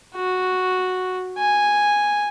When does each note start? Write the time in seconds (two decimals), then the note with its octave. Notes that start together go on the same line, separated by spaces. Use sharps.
0.15 F#4
1.38 G#5